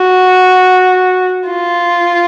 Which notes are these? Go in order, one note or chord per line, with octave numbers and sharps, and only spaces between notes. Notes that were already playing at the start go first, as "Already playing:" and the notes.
Already playing: F#4
F4